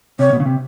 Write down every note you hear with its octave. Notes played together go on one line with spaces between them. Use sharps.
C3 C#5
B2
C#3
C3